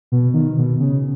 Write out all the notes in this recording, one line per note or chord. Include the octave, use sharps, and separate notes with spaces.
B2
D#3
B2
C#3